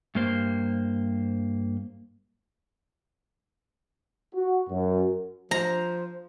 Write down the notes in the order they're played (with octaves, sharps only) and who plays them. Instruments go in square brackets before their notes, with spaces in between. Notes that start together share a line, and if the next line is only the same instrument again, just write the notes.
[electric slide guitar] G2 A#3 C5
[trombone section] F#4
F#2
[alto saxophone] F3 [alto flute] C5 [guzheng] A#5